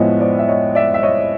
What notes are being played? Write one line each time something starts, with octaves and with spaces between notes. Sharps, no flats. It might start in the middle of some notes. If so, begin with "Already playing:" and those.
Already playing: A2 F3 G#3 B3 C#5 D#5 E5
C5 D5
E5
C#5 D#5
D5 E5
E5
C#5 D#5